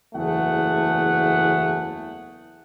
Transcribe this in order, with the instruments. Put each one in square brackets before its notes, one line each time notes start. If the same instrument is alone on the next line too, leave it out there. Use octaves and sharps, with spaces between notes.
[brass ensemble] F#1 E2 A3 G#4 F#5